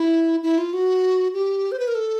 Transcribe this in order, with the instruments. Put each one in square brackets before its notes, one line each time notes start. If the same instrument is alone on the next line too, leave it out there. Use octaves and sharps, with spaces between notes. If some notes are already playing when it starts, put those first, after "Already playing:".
Already playing: [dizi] E4
E4
F4
F#4
G4
C5
B4
A#4
A4